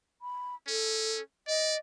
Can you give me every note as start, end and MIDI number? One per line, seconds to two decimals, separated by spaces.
0.22 0.55 83
0.68 1.19 61
0.68 1.22 69
1.48 1.75 74
1.48 1.78 75